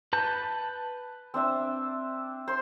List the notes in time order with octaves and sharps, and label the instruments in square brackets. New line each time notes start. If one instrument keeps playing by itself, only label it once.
[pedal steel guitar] B4 A5 G6
[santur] C4 D4 E5
C5 C6